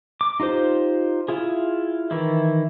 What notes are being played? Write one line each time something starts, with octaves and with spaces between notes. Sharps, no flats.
D6
D#4 F4 G4 C5
E4 F4 G#4
D#3 E3 E4